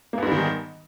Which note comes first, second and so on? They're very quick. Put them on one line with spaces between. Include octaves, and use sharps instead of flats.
A#3 B3 G#2 G3 D#3